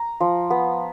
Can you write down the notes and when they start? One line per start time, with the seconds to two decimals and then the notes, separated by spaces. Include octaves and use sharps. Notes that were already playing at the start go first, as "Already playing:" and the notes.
Already playing: A#5
0.20 F3
0.50 B3